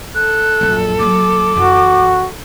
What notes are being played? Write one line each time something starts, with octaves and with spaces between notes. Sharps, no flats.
A4 F#6
A#1 F#2
F#3 A#3 D6
F#2 E3 F#4